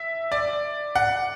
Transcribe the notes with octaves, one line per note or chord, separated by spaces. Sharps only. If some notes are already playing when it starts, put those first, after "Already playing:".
Already playing: E5
D5
F#5